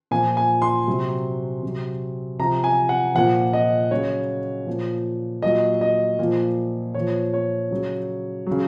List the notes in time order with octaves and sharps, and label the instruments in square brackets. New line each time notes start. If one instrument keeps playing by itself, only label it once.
[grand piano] A#2 F3 G#5
G#5
C6
C3 F#3
C3 F#3
C3 F3 A#5
G#5
F#5
A#2 F3 F#5
D#5
C#3 F#3 C#5
A#2 F3
A#2 F#3 D#5
D#5
A#2 F3
A#2 C#5
F3
C#5
C#3 F#3
C#3 F#3